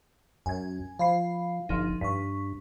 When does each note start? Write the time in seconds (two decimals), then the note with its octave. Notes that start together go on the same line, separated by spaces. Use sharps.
0.46 F#2 G#5 G#6
0.99 F3 F5 B5 C7
1.69 G1 F3 D#4
2.01 G2 C#6 B6